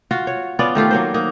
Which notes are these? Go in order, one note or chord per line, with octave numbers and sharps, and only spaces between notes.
F4 F#4
C#5
B3 C#4 F4 D5
D#3 A3 F4 G4
F#3 A#3 C5
A#3 D#4